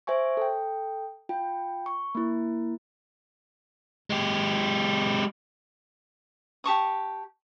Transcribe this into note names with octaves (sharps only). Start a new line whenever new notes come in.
C5 E5 G#5 C#6
A4 G5
F4 G5
C#6
A#3 E4
G#3 G4
G4 A5 C#6 D#6